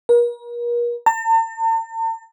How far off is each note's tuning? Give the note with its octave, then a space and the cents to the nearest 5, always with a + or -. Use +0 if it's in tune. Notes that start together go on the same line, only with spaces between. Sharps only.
A#4 +40
A5 +45